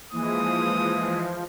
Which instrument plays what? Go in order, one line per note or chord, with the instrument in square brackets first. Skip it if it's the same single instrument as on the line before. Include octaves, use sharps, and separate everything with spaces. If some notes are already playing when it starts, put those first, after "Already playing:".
[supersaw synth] E3 G#3 [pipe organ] F3 [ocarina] A#3 [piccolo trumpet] D#6